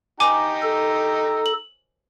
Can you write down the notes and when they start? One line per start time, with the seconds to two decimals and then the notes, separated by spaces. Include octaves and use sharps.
0.20 D#4 G4 G#5 A#5 D6
0.62 A4
1.46 F#7